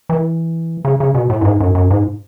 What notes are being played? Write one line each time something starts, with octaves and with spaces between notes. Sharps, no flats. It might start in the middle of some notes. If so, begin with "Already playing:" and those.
E3
C#3
C#3
B2
A2
F#2
G#2
F#2
F#2
G#2